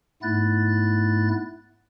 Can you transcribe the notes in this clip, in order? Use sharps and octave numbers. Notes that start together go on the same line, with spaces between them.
G#2 A3 B3 E4 F#6 A6